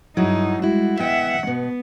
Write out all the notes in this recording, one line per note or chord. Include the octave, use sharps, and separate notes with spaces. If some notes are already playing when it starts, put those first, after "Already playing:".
G2 F#3 D#4 E4 G#4
G3 G#3 E4 F#4
G#3 B3 E5 F#5 G5
B2 B3